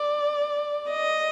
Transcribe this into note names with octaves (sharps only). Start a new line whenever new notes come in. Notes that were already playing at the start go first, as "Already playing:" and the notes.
Already playing: D5
D#5